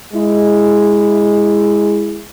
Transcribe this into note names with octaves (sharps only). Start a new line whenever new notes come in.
G#3 E4